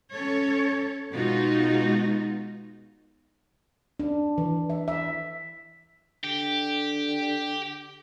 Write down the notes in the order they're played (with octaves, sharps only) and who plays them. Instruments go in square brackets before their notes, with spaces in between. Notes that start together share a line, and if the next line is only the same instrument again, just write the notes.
[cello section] C#4 A4 C#5
B2 G#3 B3 D#4 F4 F#4
[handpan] D4
E3
E5
E5
[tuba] D3 [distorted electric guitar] G4